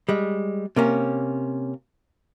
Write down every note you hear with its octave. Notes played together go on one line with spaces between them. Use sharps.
G3 G#3
C3 A#3 C#4